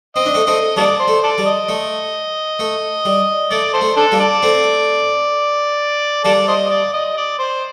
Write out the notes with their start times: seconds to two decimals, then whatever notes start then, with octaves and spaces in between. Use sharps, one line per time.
0.16 C4 D#5
0.25 D4
0.34 A3 C4
0.46 A3 C4 D#5
0.76 G3 A#3 A4 D5
0.99 C5
1.08 A3
1.23 A4 D5
1.38 G3
1.46 D#5
1.69 A3
2.59 A3
3.05 G3
3.51 A3 D5
3.73 A4 C5
3.81 A3
3.97 D4 A4
4.12 G3 A#3
4.20 D5
4.43 A3 C4
6.24 G3 A#3 A4 D5
6.48 C5 D#5
6.71 D5
6.93 D#5
7.17 D5
7.39 C5